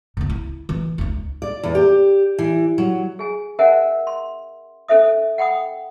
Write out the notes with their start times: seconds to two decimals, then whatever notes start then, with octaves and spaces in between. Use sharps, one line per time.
0.17 C#2 D3
0.30 E4
0.69 E3
0.98 C#2 D#4
1.42 D5
1.63 E2
1.75 G4
2.38 E3
2.78 F#3
3.19 G#4 G#5
3.59 C#4 A#4 C5 E5 F#5 G#5
4.07 C6
4.88 C#4 A4 C5 E5 D#6
5.38 F#5 G5 B5 D#6